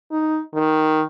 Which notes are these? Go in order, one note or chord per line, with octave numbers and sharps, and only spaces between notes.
D#4
D#3